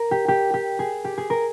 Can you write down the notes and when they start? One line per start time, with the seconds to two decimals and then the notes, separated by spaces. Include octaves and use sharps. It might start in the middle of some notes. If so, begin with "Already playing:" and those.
Already playing: A#4
0.11 G4
0.28 G4
0.54 G4
0.79 G#4
1.05 G4
1.18 G#4
1.30 A#4